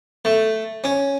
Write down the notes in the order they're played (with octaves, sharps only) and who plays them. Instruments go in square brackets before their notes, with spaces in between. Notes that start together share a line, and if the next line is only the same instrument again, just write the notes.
[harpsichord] A3
C#4